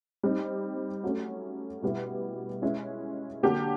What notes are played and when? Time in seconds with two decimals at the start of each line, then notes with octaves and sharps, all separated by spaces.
0.23 G3 C4 D#4
1.04 F#3 A3 C#4
1.82 B2 G3 B3 E4
2.62 G#3 C#4 E4
3.43 D3 F#3 A#3 D4 G4